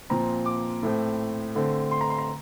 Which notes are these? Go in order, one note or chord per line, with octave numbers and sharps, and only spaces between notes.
A#2 F3 C4 A#5
D6
A2 A3 C4
D3 A3 C4
C6
A#5
C6
A#5